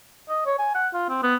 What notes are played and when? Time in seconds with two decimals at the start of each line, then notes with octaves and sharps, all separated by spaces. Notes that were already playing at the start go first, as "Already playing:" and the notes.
0.29 D#5
0.46 C#5
0.59 G#5
0.74 F#5
0.94 F4
1.09 C4
1.23 B3